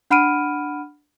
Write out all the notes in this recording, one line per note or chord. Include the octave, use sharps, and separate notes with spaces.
D4 F#5 B5 F6 D7 D#7